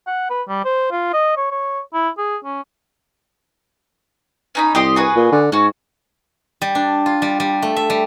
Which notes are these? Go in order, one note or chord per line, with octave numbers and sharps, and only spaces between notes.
F#5
B4
G3
C5
F4
D#5
C#5
C#5
E4
G#4
C#4
C#4 D#4 B5
C2 G4 D#5 C6
F#4 G#4 B4
A#2
D3
G#2 C#4 F#4
G3
D4
F4
G3
G3
A3
E5
G3